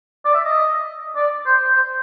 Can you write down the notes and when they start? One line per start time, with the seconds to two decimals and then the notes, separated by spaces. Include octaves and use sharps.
0.25 D5
0.34 E5
0.45 D#5
1.16 D5
1.46 C5
1.75 C5